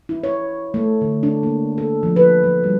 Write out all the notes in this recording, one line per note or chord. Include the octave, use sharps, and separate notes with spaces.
E4
C#5
A3
D3
D4
A#3
A4
F3
B4
F#3
G3